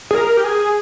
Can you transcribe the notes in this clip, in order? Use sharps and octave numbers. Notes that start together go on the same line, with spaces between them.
G#4
A#4
G4
G#4